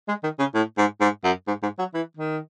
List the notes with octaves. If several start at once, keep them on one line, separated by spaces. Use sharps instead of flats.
G#3
D#3
C#3
A2
G#2
G#2
F#2
G#2
G#2
F#3
E3
D#3